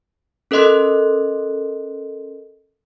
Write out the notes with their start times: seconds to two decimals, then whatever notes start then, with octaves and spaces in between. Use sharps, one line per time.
0.51 C#4 A4 A#4 D#5 C6 F#6